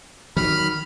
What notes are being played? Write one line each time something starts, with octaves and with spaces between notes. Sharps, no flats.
D#3 F#3 B5 F6